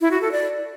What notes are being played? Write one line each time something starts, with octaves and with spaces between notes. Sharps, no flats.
E4
F#4
A4
D5